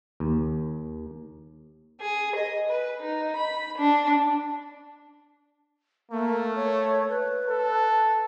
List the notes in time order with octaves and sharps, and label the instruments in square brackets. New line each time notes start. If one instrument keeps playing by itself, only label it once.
[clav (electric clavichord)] D#2
[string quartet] G#4
D#5
B4
D#4
B5
D4
[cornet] A3 [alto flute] A#3
[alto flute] C#5
B4
[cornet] A4